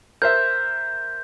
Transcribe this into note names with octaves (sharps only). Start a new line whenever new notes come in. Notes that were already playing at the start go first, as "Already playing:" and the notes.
A#4 C5 E5 G6